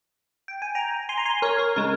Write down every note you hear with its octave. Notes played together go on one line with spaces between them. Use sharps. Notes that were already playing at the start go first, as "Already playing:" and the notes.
G5
G#5
G5 A#5
G#5 C6
A#5
G#5 C6
A#4 C#5
A#4
C#3 G#3 A#4